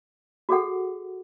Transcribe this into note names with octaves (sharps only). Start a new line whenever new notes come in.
F#4 G#4 A4 F#5